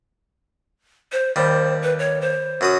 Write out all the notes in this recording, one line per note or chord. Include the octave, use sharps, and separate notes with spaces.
C5
D#2 G3 C5
B4
C#5
C5
F#2 F#4 D#6